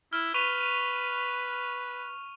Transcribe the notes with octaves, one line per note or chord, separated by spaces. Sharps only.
E4 F6
B4 C#6 D#7 F7